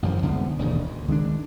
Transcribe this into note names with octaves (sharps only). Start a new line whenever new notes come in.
A1 F#2 D3 F3
C2 D3 G#3 B3
E1 D#2 G#2
D2
D#3 G#3 B3 D4